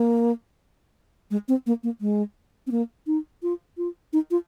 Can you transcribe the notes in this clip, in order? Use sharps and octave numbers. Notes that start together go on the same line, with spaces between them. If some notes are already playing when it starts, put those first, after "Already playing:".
Already playing: A#3
G#3
C4
A#3
A#3
G#3
C4
A#3
D#4
F4
F4
D#4
F4